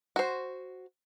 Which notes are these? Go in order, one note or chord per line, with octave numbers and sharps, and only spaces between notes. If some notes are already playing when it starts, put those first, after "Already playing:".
F#4 C5